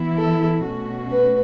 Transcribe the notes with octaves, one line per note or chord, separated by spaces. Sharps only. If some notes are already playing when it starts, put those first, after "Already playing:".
Already playing: E3 B3 E4
A4
B2 A3 C#4 F#4
B4